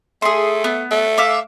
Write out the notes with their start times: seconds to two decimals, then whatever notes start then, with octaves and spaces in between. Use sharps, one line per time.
0.22 A3 G#4 C6
0.64 B3
0.91 A3
1.18 E5 F5 D6